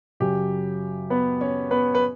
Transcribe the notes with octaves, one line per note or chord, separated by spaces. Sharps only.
F#2 C#3 F#3 G4
B3 B4
C#4 C#5
B3 B4
B4